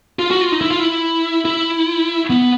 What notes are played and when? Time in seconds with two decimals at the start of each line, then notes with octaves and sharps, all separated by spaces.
0.19 F4
0.31 F#4
0.41 F4
0.52 D#4
0.61 E4
0.71 F4
0.79 E4
1.45 E4
2.30 B3